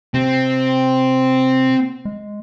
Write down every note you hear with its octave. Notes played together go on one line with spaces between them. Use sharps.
C3 C4
G#3